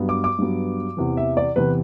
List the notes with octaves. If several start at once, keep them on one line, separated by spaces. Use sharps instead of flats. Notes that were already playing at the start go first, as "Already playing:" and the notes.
Already playing: G2 F#3 B3
D6
D6
G2 F#3 B3
E2 C3 E3
E5
D5
E2 C3 E3 B4